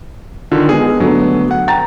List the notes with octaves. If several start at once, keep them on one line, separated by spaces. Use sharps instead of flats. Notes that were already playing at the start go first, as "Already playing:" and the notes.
D3 D#3 F4
G#3 B3 G#4
D3 F#3 A3 B3
F#5
G5 A#5 A6